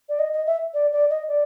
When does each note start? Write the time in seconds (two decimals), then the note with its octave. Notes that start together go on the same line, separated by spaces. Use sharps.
0.09 D5
0.19 D#5
0.33 D#5
0.46 E5
0.74 D5
0.92 D5
1.10 D#5
1.28 D5